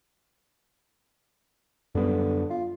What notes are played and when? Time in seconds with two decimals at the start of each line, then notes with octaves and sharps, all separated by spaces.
1.95 F#2 D3 G3 B3
2.50 F4